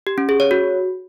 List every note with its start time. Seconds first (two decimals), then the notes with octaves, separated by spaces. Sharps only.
0.07 G4
0.18 C#4
0.29 G#4
0.40 C#5
0.51 F#4